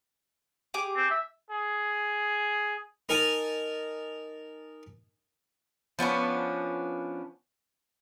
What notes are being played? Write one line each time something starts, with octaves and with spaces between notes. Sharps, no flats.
G4 G#4 D6
C4
E5
G#4
D#4 A#4 G#5 A5
F3 B3 C#4 D4